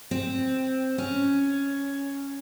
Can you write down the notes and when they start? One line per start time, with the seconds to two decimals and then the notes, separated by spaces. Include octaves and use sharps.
0.11 C4
0.98 C#4